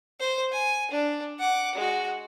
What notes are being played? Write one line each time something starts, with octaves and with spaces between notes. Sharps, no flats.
C5
G#5
D4
F#5 D6
G#3 F#4